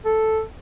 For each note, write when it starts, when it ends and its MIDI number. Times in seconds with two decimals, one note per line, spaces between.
0.05 0.42 69